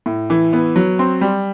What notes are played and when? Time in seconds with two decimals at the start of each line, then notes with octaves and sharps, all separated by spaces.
0.06 A2
0.30 E3
0.53 B3
0.76 F#3
0.99 C4
1.21 G3